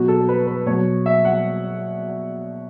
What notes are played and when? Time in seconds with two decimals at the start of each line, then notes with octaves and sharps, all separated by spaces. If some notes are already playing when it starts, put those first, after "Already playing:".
Already playing: B2 F#3 F#4
0.08 A4
0.29 B4
0.47 B4
0.66 B2 F#3 C#5
1.06 E5
1.25 F#5